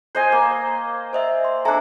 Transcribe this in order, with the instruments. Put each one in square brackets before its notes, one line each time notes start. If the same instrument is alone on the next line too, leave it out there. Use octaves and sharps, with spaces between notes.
[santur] C5 D#5 G#5
A#3
[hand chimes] C5 D#5 E5
C6
[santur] D4 A4 [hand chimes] E5 G#5 A#5